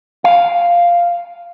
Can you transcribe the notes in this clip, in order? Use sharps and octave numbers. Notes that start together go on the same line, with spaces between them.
F5